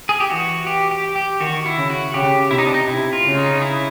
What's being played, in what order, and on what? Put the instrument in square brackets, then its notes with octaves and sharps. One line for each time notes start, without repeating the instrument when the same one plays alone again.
[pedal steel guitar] G#4
G4
[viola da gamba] E3 [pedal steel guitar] F#4
[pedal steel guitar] G4
G4
G4
[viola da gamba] D#3 [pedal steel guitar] F#4
[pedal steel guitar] E4
[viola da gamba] C#3
[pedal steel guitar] F#4
[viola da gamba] C#3 [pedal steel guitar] G4
[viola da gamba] C3 [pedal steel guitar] E4
[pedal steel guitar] D#4
D4
D#4
[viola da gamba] C3 [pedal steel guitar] E4
[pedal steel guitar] F4
[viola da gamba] C#3
[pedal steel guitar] D#4
E4